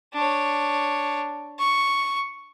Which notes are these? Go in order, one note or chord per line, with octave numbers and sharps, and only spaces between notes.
D4 C#5
C#6